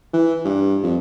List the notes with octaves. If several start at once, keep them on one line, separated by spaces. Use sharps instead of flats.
E3
G2
F2